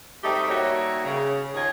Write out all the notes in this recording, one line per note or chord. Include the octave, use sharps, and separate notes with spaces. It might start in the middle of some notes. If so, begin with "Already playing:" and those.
G3 A3 C4 D#4 G4 E5
G3 A#3 D#4 F#4 C#5 E5
C#3
D#2 D#3 F4 C#5 D#5